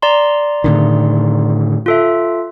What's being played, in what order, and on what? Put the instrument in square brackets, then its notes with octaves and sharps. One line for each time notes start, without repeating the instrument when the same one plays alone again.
[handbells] D5 A#5 C6
[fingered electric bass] A2 D3 D#3
[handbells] F4 A4 E5